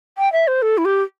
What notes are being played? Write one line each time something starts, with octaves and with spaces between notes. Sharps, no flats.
G5
E5
C5
A4
E4
G4